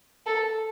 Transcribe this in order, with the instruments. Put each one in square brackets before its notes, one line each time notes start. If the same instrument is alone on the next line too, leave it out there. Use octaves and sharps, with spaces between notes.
[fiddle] A4